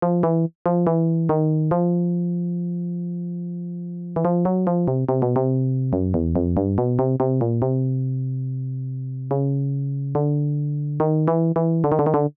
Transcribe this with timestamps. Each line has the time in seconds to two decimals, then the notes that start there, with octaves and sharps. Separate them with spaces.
0.02 F3
0.23 E3
0.66 F3
0.87 E3
1.29 D#3
1.71 F3
4.16 E3
4.25 F3
4.45 F#3
4.67 F3
4.88 C3
5.09 C3
5.22 B2
5.36 C3
5.93 F#2
6.14 E2
6.36 F2
6.57 G2
6.78 B2
6.99 C3
7.20 C3
7.41 A#2
7.62 C3
9.31 C#3
10.15 D3
11.00 D#3
11.28 E3
11.56 E3
11.84 D3
11.92 D#3
11.99 D3
12.06 D#3
12.14 D3